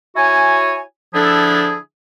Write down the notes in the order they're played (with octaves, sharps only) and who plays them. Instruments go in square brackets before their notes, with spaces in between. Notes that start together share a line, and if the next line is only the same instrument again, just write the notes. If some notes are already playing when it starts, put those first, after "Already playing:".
[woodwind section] E4 F#4 C#5 G#5
D3 F3 D4 E4 G#4 A4